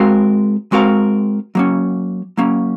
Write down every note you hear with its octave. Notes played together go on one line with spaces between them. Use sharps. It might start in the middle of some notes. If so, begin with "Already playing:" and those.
Already playing: G#3 C4 F#4 A#4 F5
G#3 C4 F#4 A#4 F5
F#3 A#3 C#4
F#3 A#3 C#4